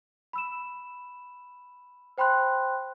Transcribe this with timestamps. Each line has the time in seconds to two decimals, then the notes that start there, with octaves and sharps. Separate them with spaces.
0.33 B5 E6 E7
2.18 C5 G5 B5 C6 F#6